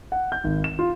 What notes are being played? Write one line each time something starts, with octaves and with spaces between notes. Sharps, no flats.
F#5
G6
G#1
E7
F4